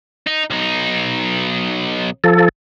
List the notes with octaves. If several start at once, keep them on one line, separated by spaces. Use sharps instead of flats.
D#4
B1 D#4
F3 A4